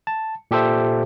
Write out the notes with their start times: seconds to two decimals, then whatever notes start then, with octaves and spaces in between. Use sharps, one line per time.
0.07 A5
0.51 A#2 G4 A4 C5 E5